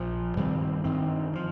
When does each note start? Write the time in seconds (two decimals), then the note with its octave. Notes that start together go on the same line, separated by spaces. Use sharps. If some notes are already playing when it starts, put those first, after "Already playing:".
Already playing: A#1 A#2 F3
0.37 G2 D#3 G3 C4
0.84 G2 D#3 C4
1.33 C3 F3